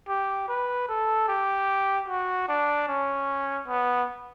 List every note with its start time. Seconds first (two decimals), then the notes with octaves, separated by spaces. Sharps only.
0.08 G4
0.48 B4
0.88 A4
1.28 G4
2.08 F#4
2.48 D4
2.88 C#4
3.68 B3